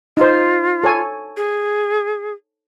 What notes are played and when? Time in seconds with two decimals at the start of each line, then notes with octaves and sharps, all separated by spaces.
0.17 D#4 F4 C5
0.84 A4 C#5 G#5
1.37 G#4